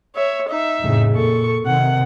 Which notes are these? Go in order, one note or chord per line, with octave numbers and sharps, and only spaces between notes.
C#5 E5
D#4 E5
F2 A2 C#3
A#2 A4 C#6
C3 D#3 F#5